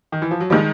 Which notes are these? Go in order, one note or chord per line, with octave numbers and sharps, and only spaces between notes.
D#3
E3
F3
F#3
D#3 F3 G3 G#3